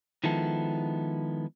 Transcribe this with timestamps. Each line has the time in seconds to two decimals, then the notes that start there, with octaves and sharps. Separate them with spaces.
0.24 D#3 F3 G#3 B3 E4 A4